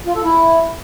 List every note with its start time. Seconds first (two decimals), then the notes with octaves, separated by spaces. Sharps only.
0.06 F4
0.15 A4
0.24 E4